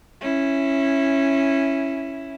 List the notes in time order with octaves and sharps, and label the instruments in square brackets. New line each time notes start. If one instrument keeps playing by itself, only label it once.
[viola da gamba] C#4 E4